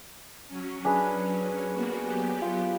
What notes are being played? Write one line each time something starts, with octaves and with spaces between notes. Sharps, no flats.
F#3 C#4
D4 G#4 B4
A#3 B3 F#4
F#3 B3 G4
F4